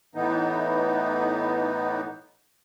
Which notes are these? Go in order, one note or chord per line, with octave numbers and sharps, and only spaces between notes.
A2 E3 B3 D#4